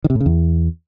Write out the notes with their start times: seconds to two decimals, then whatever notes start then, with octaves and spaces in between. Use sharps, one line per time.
0.04 D#3
0.10 C3
0.15 A2
0.20 C#3
0.26 E2